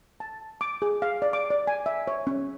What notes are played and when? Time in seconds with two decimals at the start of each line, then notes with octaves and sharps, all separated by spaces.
0.20 A5
0.61 D6
0.82 G#4
1.02 F5
1.22 D5
1.33 D6
1.50 D5
1.67 G#5
1.86 E5
2.07 C#5
2.27 C#4